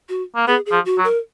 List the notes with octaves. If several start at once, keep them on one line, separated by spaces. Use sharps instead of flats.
F#4
A#3
B3 G#4
G#4
F3
F#4
F#3
A#4